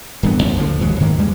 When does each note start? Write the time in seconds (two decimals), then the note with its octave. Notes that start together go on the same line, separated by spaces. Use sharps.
0.23 D1 G2 E3 B3
0.42 G#1 E2 A#2
0.56 D2 D3 E3 F3
0.79 E1 D#2 F#3 G#3
1.00 G#2 D#3 F#3 A#3
1.18 E2 G3 G#3